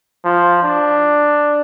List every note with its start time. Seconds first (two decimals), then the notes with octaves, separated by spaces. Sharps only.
0.25 F3
0.63 D4